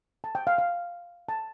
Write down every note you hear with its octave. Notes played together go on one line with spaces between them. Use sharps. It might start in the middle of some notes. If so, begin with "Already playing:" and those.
A5
G5
F5
F5
A5